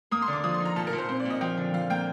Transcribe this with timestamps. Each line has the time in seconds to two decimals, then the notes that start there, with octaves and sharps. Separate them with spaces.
0.11 A#3 D#6
0.22 C6
0.27 D3
0.33 D6
0.44 F3 D#6
0.54 C6
0.60 D#4
0.65 A#5
0.76 A#2 A5
0.87 A#4
0.93 A#2
0.98 C5
1.09 C4 C5
1.20 D5
1.25 A#2
1.30 D#5
1.41 F3 G5
1.58 D3
1.74 F3 F5
1.90 A#3 G5